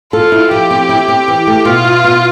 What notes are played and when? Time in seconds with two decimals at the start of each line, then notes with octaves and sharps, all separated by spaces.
0.13 F4 A4
0.32 E4
0.51 F3 G4
0.71 C4
0.89 E4
1.08 C4
1.28 E3
1.47 A3
1.65 B2 F4
1.84 E4
2.04 B2